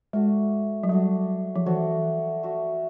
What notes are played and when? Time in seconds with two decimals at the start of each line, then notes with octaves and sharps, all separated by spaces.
0.13 G#3 A3 D4 F#4
0.83 F#3
0.89 G3 A3 D4 F#4
1.56 F3
1.66 E3 A3 D4 F#4
2.43 A3 D4 F#4